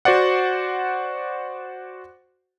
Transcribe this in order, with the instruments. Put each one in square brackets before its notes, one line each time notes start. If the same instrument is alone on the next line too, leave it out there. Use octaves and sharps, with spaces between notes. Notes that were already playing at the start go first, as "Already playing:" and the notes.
[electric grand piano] F#4 C5 D5 F#5